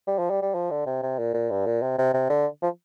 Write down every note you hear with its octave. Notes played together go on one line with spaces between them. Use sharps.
G3
F3
G3
G3
F3
D3
C3
C3
A#2
A#2
G2
A#2
C3
C3
C3
D3
F3